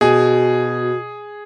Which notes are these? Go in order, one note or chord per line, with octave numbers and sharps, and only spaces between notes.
B2 F#4 G#4 G#5